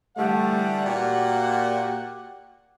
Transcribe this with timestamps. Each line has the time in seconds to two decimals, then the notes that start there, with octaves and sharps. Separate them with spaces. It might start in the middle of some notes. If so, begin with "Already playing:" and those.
0.17 D3 E3 G3 A3 F#5
0.86 A#2 F#4 G4